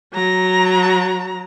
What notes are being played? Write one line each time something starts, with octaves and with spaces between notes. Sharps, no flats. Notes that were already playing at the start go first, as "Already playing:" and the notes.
F#3 A#5